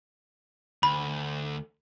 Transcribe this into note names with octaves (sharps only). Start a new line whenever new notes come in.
D2 B5